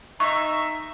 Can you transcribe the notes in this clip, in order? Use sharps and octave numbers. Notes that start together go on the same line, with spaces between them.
D#4 E5 C#6